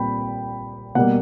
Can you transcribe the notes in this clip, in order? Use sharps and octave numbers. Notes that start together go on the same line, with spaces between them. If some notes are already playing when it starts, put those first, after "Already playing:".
Already playing: A#2 G3 C4 G5 B5
B2 G3 A#3 F#5